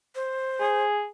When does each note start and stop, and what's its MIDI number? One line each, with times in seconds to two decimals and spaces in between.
0.15 0.85 72
0.60 1.06 68